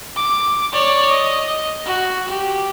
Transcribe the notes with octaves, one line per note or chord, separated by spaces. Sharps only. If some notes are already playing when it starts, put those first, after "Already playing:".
D6
C#5 D5
D#5
F#4
G4